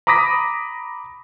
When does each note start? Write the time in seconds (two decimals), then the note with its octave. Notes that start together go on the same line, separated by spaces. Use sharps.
0.07 A#5 B5 D6 D#6 A#6 B6